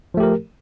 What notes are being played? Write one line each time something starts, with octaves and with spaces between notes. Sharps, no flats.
F3 A3 G4 A#4